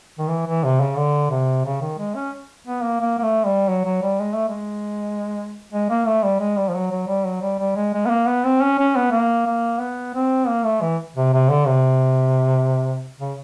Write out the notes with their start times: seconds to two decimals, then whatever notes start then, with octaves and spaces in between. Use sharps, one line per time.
0.19 D#3
0.29 E3
0.47 E3
0.64 C3
0.80 C#3
0.97 D3
1.31 C3
1.65 C#3
1.82 D#3
1.98 G#3
2.15 C#4
2.68 B3
2.83 A#3
3.01 A#3
3.19 A#3
3.23 A3
3.46 G3
3.69 F#3
3.85 F#3
4.02 G3
4.20 G#3
4.34 A3
4.48 G#3
5.73 G#3
5.90 A#3
6.06 A3
6.24 G3
6.40 G#3
6.57 G3
6.69 F3
6.75 F#3
6.92 F#3
7.08 G3
7.26 F#3
7.42 G3
7.59 G3
7.76 G#3
7.94 G#3
8.06 B3
8.10 A#3
8.27 B3
8.45 C4
8.61 C#4
8.79 C#4
8.96 B3
9.12 A#3
9.46 A#3
9.80 B3
10.15 C4
10.48 A#3
10.65 A3
10.82 E3
11.16 C3
11.33 C3
11.50 D3
11.68 C3
13.19 C#3